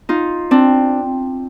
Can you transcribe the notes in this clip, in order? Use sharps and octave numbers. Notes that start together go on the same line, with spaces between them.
D#4 F4
C4 D4